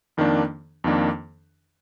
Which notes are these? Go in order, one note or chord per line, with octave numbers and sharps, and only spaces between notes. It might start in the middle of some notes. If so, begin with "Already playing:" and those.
F2 D#3 A#3 D4
F2 D#3 A#3 D4